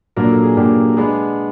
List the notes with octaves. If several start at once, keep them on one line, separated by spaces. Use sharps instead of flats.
A#2 F#3 A#3 D4 A#4
A4
G#4
A#2 F#3 A#3 D4 G4
G#3 B3 D4 G#4